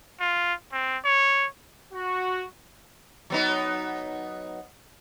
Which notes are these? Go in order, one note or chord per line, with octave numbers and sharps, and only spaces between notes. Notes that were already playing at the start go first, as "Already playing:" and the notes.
F4
C4
C#5
F#4
F#3 B3 D#4